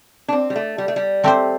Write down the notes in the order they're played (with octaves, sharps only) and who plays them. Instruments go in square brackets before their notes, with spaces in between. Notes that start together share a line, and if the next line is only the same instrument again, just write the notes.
[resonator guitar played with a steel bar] D4
C4
G3
A3
G3
A3
G3
[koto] A3 C4 G4 C5